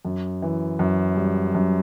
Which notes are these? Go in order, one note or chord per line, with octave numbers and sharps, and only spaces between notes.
F#2
E3
F#2
G3
F#2